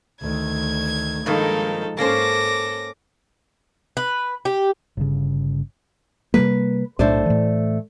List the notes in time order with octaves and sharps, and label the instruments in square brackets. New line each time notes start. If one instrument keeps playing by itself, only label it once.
[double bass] D2 D#3 [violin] G#6
[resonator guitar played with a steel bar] G2 D#3 A#3 [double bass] F3 G#3 [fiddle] D#4 A4
[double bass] G#2 [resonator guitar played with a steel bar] A#3 C#4 C5 [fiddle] A4 [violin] D6 A#6
[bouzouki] B4
G4
[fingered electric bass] G1 C#3
[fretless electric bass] C3 G3 A#3 [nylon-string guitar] B4
[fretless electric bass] B1 A2 D4 [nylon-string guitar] A3 C5 D5
[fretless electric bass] A2 E3